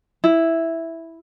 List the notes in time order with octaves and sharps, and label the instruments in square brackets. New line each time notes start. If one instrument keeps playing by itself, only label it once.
[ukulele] E4